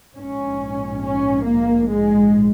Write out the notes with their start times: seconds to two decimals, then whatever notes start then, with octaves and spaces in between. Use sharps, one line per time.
0.14 A#1 G#2 C#4
1.02 C#4
1.45 A#3
1.88 G#3